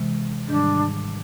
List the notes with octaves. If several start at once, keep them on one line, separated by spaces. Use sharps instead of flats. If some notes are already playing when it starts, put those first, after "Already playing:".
Already playing: C3 E3 G#3
G#2 D#3 G3 D4